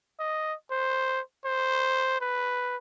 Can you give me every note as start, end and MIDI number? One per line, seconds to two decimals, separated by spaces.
0.20 0.54 75
0.71 1.21 72
1.45 2.20 72
2.21 2.76 71